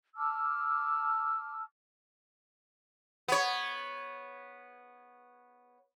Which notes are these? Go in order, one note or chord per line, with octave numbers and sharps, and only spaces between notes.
A5 D6 E6 F6
B3 C#5